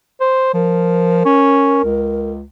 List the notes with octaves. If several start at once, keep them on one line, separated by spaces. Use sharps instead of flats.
C5
F3 A#4
C#4
C#2